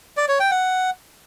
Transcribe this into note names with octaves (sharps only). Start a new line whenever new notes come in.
D5
C#5
G5
F#5